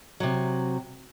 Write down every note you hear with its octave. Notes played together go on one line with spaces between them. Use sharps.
C3 F#3